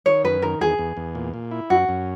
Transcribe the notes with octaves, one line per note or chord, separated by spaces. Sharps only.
D#3 C#5
F#2 B4
D#3 A#4
E2 G#4
E2
E2
A#2
A#2
E4
F#2 F#4
F#2